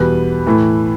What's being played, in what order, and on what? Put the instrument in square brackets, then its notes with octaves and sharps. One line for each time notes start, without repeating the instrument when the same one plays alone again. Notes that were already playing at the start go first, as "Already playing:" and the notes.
Already playing: [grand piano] E2 B2 G3 B4
A2 E3 A3